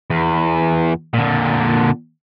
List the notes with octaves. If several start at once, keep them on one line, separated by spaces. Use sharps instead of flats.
E2
A#2 D3